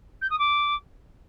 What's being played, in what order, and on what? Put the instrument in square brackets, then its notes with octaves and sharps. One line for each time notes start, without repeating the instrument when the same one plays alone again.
[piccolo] G6
D#6
D6